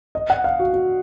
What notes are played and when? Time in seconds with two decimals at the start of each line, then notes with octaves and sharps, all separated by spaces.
0.15 D#5
0.30 F#5
0.44 F5
0.59 F#4
0.73 F#4